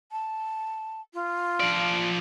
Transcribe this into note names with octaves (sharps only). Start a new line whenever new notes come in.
A5
F4
F3 D5